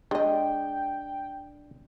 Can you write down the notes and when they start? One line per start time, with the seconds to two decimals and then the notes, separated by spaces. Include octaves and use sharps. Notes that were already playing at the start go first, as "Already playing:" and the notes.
0.11 G#3 D4 D#5 G5